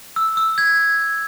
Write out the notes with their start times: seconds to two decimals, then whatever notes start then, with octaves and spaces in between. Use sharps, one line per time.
0.16 E6
0.37 E6
0.58 G#6